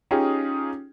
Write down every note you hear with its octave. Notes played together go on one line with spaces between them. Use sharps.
C#4 D#4 F4 G4 G#4